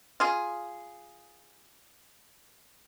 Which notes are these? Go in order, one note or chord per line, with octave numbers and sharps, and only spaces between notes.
F4 G#4